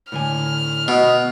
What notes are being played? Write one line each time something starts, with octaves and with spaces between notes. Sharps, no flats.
A2 D3 G#5 F6
B2 D#5